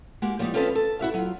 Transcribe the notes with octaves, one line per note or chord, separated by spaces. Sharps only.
G#3 A#3 F#4 G4
F3 G3 A#3 C4 D#4
C4 C#4 F4 A4 B4 D#5
A4
E4 F#4 E5 F5
F#3 F4